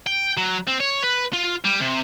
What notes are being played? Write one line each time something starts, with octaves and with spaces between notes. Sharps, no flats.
G5
F#3
C4
C#5
B4
F4
G3
C3